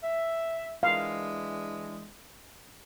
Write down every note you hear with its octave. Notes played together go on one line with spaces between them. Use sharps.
E5
E3 G#3 D4 F5